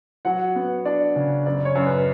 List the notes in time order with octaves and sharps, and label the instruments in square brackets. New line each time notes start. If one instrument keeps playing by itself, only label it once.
[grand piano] F#3 F#5
B3
D4 D5
C#3
F#2 D5
C#5
F#2
B4